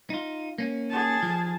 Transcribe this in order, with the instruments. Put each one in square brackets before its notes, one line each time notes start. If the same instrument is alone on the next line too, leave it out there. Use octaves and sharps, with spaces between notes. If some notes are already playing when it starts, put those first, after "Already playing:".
[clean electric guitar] D#4 F4
A#3 C#4
[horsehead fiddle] G#4 A5
[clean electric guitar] F3